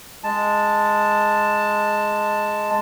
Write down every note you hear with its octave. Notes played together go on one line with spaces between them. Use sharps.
G#3 A5